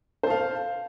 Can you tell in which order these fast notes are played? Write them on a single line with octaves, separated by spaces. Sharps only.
C5 A5 F5